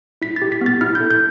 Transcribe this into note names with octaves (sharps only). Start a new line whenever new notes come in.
E4 B6
A6
G4
B6
B3 A6
E4 F6
G6
A4
G6